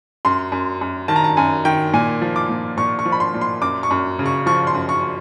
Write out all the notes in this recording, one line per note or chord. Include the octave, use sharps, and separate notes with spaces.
F#2 C6
F#2
F#2
D#3 A5
A#5
A5
F#2 G#5
D#3 G5
A#2 G#5
F3
D6
A#2
A#2 C#6
C#6
F3
B5
C6
A#2
C6
F#2 D6
C#6
F#2
C#3
C#6
F3 C#6
C6
F#2
C#6